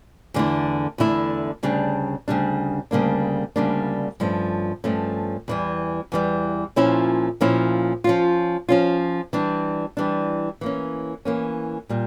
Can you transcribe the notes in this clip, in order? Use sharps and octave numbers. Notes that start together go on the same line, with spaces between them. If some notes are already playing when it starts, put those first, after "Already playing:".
E2 D3 A3 E4
E2 D3 A3 E4
D2 C#3 G3 D4
D2 C#3 G3 D4
D2 C#3 G3 A#3 D4
D2 C#3 G3 A#3 D4
G2 F3 A3 C#4
G2 F3 A3 C#4
E2 E3 G3
E2 E3 G3
A#2 F3 C#4 E4
A#2 F3 C#4 E4
F3 C#4 F4
F3 C#4 F4
E3 G3 D4
E3 G3 D4
E3 A#3 C#4
E3 A#3 C#4
A#2 G3